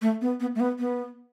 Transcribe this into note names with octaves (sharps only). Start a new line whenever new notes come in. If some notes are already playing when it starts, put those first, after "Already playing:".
A3
B3
B3
A3
B3
B3